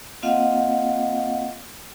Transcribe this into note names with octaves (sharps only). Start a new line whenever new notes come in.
A#3 C4 F4 D#5 F5 F#5